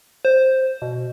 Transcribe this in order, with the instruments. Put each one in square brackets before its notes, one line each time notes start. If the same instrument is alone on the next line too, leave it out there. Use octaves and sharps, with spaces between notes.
[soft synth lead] C5
B2